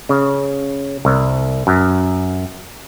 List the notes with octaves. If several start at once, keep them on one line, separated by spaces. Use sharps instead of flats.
C#3
C2
F#2